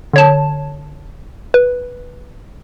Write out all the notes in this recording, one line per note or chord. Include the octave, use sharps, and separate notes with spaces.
D3 C#5 A5
B4